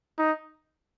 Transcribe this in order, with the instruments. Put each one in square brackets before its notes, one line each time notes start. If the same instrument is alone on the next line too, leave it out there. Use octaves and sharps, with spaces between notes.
[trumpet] D#4